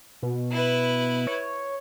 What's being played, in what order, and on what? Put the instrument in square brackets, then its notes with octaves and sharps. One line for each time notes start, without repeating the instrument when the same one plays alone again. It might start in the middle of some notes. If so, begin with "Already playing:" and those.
[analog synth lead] B2
[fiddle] E4 B4
[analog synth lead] C#5